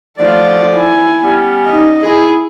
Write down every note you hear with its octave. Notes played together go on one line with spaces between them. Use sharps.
D3 F3 A3 F4 D5
E4 G#5
G3 B3 C#4
D#4 D#5
E4 G#4